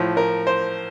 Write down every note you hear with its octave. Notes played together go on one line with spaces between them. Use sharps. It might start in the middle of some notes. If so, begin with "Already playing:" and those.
Already playing: A2 F3
A#4
C5